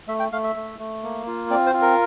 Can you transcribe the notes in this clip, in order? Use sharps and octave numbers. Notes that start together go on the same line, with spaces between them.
A3 E5
G5
A3 F5
E5
A3
A3
A#3
F4
C4 D5
C5
F4
A#4